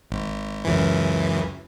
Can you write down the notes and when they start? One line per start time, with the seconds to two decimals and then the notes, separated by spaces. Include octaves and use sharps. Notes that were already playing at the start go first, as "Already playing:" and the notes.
0.11 G#1
0.65 C#2 F#2 E3